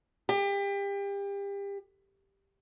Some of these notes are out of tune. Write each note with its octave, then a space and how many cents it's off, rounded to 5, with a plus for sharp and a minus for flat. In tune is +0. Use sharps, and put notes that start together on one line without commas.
G4 +30